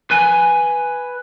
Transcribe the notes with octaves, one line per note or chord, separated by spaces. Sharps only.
B4 G#5